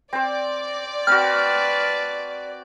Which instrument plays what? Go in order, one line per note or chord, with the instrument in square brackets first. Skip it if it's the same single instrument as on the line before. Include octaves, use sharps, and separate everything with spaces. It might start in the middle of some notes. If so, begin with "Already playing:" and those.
[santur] C4 C5 [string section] D5
[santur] C4 F#4 [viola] B4 A5 [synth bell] F6